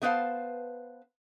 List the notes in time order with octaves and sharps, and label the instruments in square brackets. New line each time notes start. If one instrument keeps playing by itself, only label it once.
[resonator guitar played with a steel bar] A3 B3 B4 C5 F5 A5